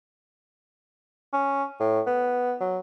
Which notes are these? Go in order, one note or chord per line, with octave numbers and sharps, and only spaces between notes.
C#4
A2
B3
F#3